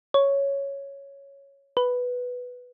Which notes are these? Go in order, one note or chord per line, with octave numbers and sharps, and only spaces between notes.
C#5
B4